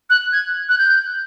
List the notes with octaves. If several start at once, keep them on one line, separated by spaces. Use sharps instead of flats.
F#6
G#6
F#6
G6